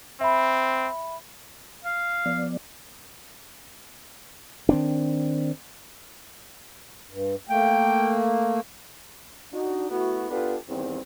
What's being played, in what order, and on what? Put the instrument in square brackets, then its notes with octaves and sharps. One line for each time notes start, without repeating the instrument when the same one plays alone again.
[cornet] C4 [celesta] E5 B5
[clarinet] F5
[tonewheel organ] F3 B3 D5
[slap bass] D#3 C4 D4
[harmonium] G2
[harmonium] A3 A#3 [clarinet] G5
[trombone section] D4 D#4 F#4
A3 B3 E4 F#4
B3 D4 F4 G4 A4 B4
E2 G2 D#3 C4